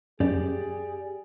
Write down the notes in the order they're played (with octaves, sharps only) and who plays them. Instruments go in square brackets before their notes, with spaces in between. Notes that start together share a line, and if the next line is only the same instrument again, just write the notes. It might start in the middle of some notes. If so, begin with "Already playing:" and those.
[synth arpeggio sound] F#2 [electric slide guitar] G4 D5 [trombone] G#4